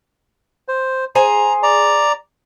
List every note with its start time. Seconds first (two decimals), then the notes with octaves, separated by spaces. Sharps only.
0.68 C5
1.15 G#4 C5 G#5 A#5
1.63 D5 A#5